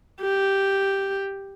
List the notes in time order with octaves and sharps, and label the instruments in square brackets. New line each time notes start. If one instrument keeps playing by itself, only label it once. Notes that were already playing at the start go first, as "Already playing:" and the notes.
[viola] G4